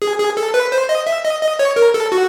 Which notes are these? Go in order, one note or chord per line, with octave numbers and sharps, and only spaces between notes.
G#4
G#4
A4
B4
C5
D#5
E5
D#5
D#5
C#5
A#4
A4
F#4